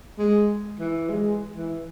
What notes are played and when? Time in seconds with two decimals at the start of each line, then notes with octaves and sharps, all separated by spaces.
0.18 G#3
0.79 E3
1.09 G#3
1.56 E3